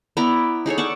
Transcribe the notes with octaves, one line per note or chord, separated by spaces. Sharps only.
B3 E4 D5 A#5
D#4 G#4 A4 C#5
D5 F#5 A5 C#6